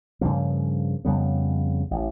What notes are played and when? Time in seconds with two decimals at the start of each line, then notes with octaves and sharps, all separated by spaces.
0.21 G2 C#3 F3 A#3
1.05 F2 C#3 G3 B3
1.91 A1